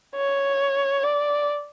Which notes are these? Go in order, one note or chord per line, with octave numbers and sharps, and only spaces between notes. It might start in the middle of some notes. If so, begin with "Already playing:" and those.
C#5
D5